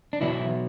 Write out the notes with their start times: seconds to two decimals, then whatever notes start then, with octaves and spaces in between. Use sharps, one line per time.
0.13 D4
0.21 B2 E3 F#3 E4